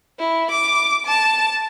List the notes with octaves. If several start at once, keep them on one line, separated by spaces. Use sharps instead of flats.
E4
D6
A5